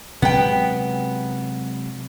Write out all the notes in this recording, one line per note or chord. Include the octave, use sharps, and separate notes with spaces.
C3 F#3 G#3 B3 G5